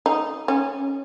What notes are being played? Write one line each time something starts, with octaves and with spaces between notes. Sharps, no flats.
D#4
C#4